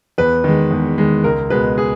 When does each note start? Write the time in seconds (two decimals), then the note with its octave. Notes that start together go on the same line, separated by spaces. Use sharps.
0.18 E2 B4
0.44 D#3 G#3
0.71 E2
0.98 D#3 G#3
1.24 C#2 A#4
1.50 B2 G#3 B4
1.78 G#4